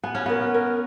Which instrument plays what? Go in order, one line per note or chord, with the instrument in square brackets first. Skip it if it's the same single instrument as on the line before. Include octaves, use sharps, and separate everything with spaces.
[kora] B3 [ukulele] G#5
[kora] C#4
[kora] B3 [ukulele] A#4
[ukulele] A#4